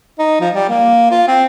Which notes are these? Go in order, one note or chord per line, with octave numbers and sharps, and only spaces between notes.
D#4
F3
G3
A#3
F4
C4